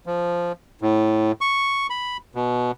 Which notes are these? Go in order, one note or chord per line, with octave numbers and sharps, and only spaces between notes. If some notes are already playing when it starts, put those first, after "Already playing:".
F3
A2
C#6
B5
B2